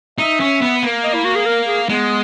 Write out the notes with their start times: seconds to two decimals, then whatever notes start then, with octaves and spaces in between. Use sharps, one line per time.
0.18 D#4 E5
0.40 C#4
0.62 B3
0.83 A#3
1.04 D#5
1.14 E4
1.25 F#4
1.36 G#4
1.46 A#4
1.67 G#4
1.89 G#3 B3